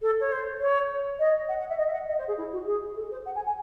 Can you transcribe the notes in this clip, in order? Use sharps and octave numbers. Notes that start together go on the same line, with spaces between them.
A4
C#5
C5
C#5
D#5
F#5
F#5
E5
D#5
E5
F#5
D#5
C5
G#4
E4
F#4
G#4
A4
C5
F#5
G#5
G#5